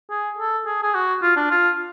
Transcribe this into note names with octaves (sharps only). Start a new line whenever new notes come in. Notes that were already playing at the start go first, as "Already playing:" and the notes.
G#4
A4
G#4
G#4
F#4
F4
D4
F4